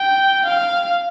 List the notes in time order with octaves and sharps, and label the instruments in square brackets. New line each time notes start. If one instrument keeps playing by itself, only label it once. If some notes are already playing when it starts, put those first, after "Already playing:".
Already playing: [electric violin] G5
F5